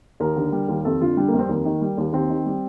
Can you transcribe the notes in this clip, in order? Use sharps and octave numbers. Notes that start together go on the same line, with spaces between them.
D#2 A#4
D3
G3
D#2
F2 A4
D3 F4
G3 D4
A#3
F2
C4
D#2 A#3
D#3
G3
D#2
D#2 C4
D#3
G3